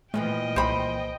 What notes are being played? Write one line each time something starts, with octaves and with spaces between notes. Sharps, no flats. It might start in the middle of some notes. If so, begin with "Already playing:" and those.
A#2 E3 F3 A3 D#5 G5
C2 C5 B5